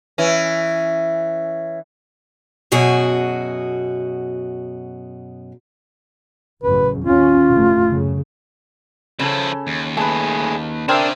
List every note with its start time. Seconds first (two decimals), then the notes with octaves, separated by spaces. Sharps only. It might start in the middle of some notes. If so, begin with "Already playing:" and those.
0.18 E3 C#4
2.72 F#2 B2 F#4 G#4
6.63 A1 F#2 C#3 B4
7.04 D#2 C#4 F4
7.50 F1 A2 A3
7.91 F#2 C#3
9.19 C#3 F3 C#4 E4 A4
9.67 D#2
9.97 A3 G#4 B4 A5
10.89 C4 D4 G#4 A#4 E5 F5